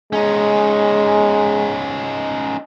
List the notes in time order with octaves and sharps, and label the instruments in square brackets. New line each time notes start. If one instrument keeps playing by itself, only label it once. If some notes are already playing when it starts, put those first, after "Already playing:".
[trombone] G#3 [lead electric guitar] C#4 D#4